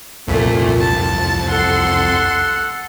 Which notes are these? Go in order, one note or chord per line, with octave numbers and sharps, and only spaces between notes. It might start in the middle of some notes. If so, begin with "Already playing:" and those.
C2 F2 A#2 A3
A5
A4 F#5 C6